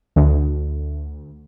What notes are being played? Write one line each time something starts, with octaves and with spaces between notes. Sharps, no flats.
D2